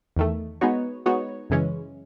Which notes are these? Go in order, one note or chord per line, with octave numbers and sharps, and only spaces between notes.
E2 D#3 A3
G#3 B3 D#4 F#4 C#5
G#3 B3 D#4 F#4 C#5
F#2 C#3 E3 G#3 C#4